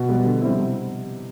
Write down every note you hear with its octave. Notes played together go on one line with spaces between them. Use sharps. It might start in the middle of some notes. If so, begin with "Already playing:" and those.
Already playing: B2
G3 B3
D3
G3 C4 E4
C3